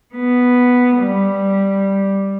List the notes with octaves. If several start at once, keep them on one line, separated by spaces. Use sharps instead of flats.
B3
G3